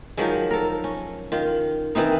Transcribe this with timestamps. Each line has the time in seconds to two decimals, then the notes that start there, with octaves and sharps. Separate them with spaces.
0.17 D#3 F3 F#3 G#3
0.51 A4 A#4
0.84 C#4
1.32 D#3 F4
1.95 D#3 E3 C4 D#4